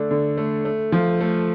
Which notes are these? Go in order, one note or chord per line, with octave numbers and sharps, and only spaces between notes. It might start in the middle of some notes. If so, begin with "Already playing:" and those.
Already playing: D3 A3 D4
D3
A3
A3
F3
A3